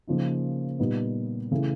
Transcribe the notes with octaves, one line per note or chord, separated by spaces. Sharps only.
C#3 F3 A#3 D#4
A#2 G3 B3 D#4
C#3 E3 A3